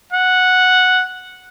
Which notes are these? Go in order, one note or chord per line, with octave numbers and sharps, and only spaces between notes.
F#5